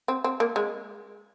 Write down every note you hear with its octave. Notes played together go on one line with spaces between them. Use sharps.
C4
C4
A#3
G#3